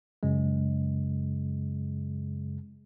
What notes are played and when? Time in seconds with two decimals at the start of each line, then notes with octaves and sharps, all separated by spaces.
0.23 F#2 C#3 G#3